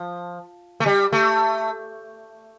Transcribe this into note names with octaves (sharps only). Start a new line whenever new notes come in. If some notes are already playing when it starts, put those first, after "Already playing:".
Already playing: F3
A3
G3
A3